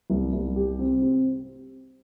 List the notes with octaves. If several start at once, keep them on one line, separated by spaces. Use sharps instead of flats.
C2
C2
G4
C4
C4